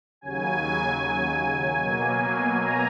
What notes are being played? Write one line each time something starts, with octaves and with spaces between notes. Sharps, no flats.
D#2 C#3 F#3 G#5
B2 F#3 A#3
A#5